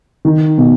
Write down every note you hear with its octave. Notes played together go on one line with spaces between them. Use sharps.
D#3
B2